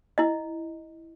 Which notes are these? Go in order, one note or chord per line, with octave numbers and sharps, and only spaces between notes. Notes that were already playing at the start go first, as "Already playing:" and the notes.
E4 D#5